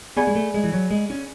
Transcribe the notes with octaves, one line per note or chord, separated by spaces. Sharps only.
B3 G#4 D5 G#5 B5
G#3
A3
G#3
E3
F#3
G#3
C#4